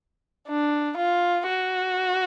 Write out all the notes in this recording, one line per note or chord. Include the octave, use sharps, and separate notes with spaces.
D4
F4
F#4